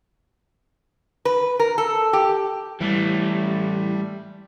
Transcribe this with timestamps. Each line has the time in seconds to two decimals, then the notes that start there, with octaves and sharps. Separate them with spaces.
1.25 B4
1.59 A#4
1.78 A4
2.13 G4
2.81 E3 G3 A3